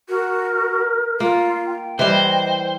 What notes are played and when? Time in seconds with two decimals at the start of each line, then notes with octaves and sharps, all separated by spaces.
0.09 F#4 A#4
1.20 A#3 F4
1.66 G5
1.99 E3 G3 C5 D#5